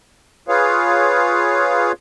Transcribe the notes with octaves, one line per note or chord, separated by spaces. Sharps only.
F4 G#4 B4 C#5 F5